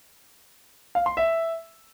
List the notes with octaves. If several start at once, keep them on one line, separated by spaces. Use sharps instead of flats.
F5
C6
E5